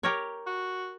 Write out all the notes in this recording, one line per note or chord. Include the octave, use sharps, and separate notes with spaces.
G4 A#4 C#5
F#4